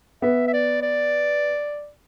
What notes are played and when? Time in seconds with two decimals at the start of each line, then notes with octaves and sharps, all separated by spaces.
0.22 B3 E5
0.48 E5
0.53 D5
0.82 D5